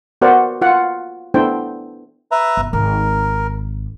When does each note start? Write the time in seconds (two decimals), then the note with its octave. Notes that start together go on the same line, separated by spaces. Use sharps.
0.22 B3 F#4 A#4 C5 D5 F#5
0.61 F4 F#5
1.34 B3 D4 E4 A4 C5 G5
2.31 B4 E5 A#5
2.57 G1
2.73 G#1 A#4